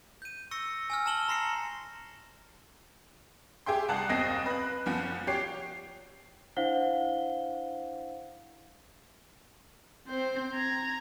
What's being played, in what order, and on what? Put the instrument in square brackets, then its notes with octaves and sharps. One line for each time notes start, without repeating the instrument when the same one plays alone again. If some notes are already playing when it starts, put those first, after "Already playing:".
[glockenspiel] G6 D#7
C#6 E6 A#6 C#7
G#5 E6 F6
A5 E6 E7 F#7 G7
A#5 C6 A#6 C7 C#7
[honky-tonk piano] G4 G#4 E5 G5 C6
C2 F#5 A5 F#6
F#1 D#2 C4 D#5 A#6 C7
B4 F#6
F#1 F3 F#5
G4 C#5 C7
[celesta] D4 E4 C5 F5 F#5 G7
[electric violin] C4 C5
A#5 G#6